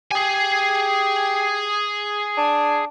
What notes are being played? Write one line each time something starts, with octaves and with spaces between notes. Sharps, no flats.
G4 G#4 G#5
D4